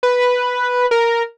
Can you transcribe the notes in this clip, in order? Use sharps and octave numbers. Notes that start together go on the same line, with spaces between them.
B4
A#4